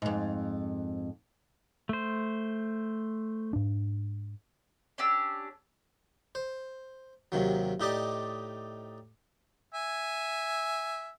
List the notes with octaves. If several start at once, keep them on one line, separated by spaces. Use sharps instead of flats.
F2 G#2
A3 C5
G#2 D4
C#4 D4 G4 E6
C5
D#2 C3 D#3 F#3
A2 D#4 G4 D5 D#5 D6
E5 G#5